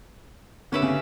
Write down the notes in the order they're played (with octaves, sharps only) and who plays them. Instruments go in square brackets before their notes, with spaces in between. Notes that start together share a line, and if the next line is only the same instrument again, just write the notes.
[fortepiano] D3 [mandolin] C#4 G4 B4 E5
[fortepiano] C#3